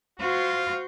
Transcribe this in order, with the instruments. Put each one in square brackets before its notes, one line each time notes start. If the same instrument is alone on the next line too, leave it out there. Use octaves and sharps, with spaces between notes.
[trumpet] F4 [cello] F#4 C5